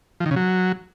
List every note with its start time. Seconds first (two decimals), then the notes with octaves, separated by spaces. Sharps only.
0.20 F3
0.26 D#3
0.31 C#3
0.36 F#3